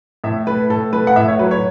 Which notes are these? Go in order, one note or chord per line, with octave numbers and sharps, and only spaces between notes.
A2 E5
A3 B4
A2 A4
A3 B4
F#5
A2 E5
C#5
F#3 B4
C#5